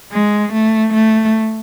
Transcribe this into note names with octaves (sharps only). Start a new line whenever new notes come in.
G#3
A3
A3